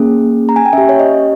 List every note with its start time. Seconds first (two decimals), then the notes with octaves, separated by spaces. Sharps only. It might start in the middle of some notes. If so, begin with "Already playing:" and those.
Already playing: A#3 C#4 G#4
0.49 A#5
0.56 G#5
0.65 G5
0.73 C#4 G4 E5
0.89 C#5
0.99 D#5